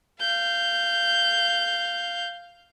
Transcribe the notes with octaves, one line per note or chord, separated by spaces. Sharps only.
F5 G6